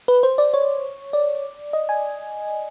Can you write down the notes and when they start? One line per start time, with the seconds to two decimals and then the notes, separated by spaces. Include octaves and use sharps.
0.08 B4
0.23 C5
0.38 D5
0.54 C#5
1.13 D5
1.73 D#5
1.89 G#5